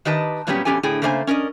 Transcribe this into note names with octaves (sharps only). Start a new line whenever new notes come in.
D#3 G4 B4 D#5 A5
A#2 F#3 G3 B3 C#4 G4
F2 B2 C#4 G4 A4 G#5
A2 D3 G#4 G5
C#3 A3 A#3 C5 D5 G#5
C#4 A#4 D5 D#5